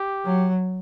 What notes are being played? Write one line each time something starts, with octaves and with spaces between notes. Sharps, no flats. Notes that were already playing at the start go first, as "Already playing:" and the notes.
Already playing: G4
F#3